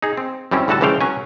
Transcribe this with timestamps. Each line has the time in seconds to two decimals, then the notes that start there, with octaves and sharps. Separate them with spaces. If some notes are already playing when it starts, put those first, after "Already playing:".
0.02 D#4 G#4
0.17 C4
0.51 F#2 G3 C4 C#4 E4
0.68 A2 D3 G3 F#4 A4 A5
0.81 C#2 E3 F3 C#5 F5 G5
1.01 F#3 C#4 G#5